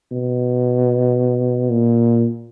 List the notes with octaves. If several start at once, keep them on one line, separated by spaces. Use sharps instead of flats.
B2
A#2